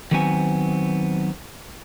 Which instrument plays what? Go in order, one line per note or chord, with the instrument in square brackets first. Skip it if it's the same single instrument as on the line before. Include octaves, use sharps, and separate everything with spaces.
[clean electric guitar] D#3 F#3 B3 C4 G#5